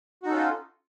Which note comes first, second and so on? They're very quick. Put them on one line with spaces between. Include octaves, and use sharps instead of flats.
F#4 D#4 A4 C#4 F4